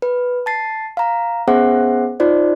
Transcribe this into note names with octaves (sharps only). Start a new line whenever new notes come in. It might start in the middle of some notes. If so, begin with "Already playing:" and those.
B4
A5 A6 C7
F5 A#5
B3 C#4 G#4 C5 E5 F#5
D#4 F4 C5 D5